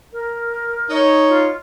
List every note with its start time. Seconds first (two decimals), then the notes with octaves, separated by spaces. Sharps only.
0.13 A#4
0.90 D#4 C#5
1.29 F4